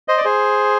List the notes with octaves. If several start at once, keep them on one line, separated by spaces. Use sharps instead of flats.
C5 D#5
D5
G#4 C5